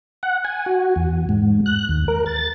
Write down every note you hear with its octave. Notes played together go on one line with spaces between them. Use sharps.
F#5
G#5
F#4
E2
G#2
F#6
D#2
A#4
A6